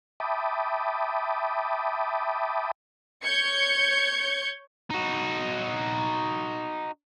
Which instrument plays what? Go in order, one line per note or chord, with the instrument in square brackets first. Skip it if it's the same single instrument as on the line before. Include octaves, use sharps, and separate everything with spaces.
[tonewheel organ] E5 G5 A5 B5 D6 D#6
[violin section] C#5 G6 G#6 C#7
[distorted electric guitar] D#4 F#4